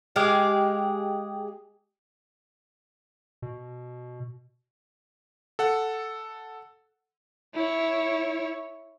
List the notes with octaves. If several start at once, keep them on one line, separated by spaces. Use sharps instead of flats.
G#3 G4 G#4 F5
B2
A4 F#5
E4 C#5